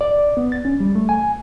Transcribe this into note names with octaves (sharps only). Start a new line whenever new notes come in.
D5
B3
A6
C#4
G3
A3
G#5